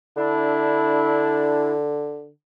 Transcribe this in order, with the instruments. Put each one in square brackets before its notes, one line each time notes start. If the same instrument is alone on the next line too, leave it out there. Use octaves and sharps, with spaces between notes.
[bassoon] D3 [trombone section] D4 E4